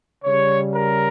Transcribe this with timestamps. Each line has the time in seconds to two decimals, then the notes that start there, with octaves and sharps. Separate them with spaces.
0.24 C#3 G3 C#5
0.74 A#4